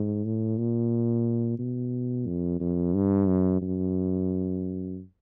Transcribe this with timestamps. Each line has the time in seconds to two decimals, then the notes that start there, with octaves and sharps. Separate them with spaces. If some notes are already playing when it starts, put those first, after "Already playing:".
Already playing: G#2
0.25 A2
0.58 A#2
1.59 B2
2.27 F2
2.60 F2
2.94 G2
3.28 F#2
3.62 F#2